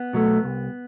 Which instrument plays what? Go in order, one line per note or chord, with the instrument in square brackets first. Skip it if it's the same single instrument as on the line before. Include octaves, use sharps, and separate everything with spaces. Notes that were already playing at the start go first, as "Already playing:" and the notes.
Already playing: [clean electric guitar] B3
B2 F#3 A3
C2